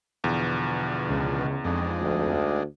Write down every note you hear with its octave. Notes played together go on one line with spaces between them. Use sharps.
E2 B2 D3 F3
C#2
F2 G#3 D4 D#4
D2